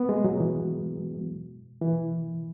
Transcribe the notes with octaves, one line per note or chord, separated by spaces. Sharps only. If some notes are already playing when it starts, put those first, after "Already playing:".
Already playing: B3
G#3
F#3
E3
E3